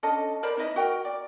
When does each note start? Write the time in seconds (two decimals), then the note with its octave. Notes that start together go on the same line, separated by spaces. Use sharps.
0.03 C#4 D4 A4 D#5
0.43 A#4 C5 D5 B5
0.57 D#4 E4 B4 D#5
0.76 F#4 A#4 G5
1.05 D5